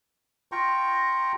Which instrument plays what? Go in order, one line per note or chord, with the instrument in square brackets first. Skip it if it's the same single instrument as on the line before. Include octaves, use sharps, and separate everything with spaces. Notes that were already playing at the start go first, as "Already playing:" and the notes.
[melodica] F4 G5 A#5 C#6